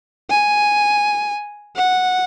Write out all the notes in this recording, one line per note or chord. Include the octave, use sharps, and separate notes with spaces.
G#5
F#5